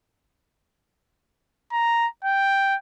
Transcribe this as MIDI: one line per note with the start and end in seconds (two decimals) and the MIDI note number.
1.73 2.07 82
2.24 2.75 79